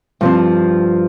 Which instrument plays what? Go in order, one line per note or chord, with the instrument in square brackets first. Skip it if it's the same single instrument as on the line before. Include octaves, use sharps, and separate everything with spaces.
[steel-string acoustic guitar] G2 F3 C4